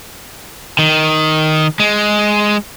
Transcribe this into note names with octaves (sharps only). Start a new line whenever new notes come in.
D#3
G#3